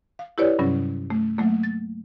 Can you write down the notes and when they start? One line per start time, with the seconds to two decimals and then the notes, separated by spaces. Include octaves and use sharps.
0.19 F5
0.38 E4 G4 B4 C#5 D5
0.59 G2 C3 F#3 G3 C#4
1.10 A3
1.38 F#3 A3 A#3
1.63 A6